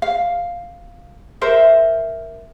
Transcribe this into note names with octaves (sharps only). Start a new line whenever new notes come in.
F5
A#4 C5 E5